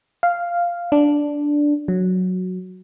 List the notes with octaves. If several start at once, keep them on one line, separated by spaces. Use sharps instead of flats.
F5
D4
F#3